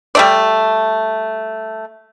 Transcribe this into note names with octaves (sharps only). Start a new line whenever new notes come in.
G3 A3 D5